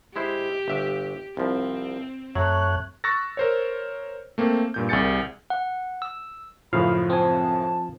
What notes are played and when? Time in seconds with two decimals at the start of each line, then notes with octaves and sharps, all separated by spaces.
0.16 G#3 E4 G4 C5
0.68 G1 E5
1.37 C2 F3 C4
2.35 F#2 F#3 A3 C#5 F#6
3.04 C#6 E6 F#6 A6 A#6
3.37 A#4 C5 C#5
4.38 A3 A#3 C4
4.74 G2 A#2 G6
4.89 C2 G#4 G#5 G6 A6 C#7
5.50 F#5
6.02 E6
6.73 F#2 A2 C#3 F3 F5 B5
7.10 C4 G#5 A5